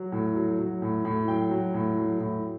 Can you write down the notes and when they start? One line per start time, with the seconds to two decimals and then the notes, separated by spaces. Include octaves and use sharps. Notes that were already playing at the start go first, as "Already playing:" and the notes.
Already playing: F#3
0.12 A2
0.36 F#3
0.59 F#3
0.82 A2
1.05 A2
1.27 F#3 G5
1.51 F#3
1.74 A2
1.97 F#3
2.20 A2